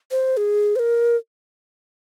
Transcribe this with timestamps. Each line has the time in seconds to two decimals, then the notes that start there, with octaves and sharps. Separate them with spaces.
0.11 C5
0.37 G#4
0.76 C5
0.79 A#4